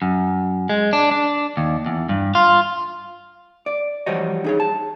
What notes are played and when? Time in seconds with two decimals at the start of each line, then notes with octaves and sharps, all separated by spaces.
0.02 F#2
0.69 G#3
0.93 D4
1.11 D4
1.57 D#2
1.86 E2
2.09 G2
2.35 F4
3.66 D5
4.06 E3 F3 G3 F#4 C#5 D#5
4.44 D#4 G#4 C#5
4.60 A5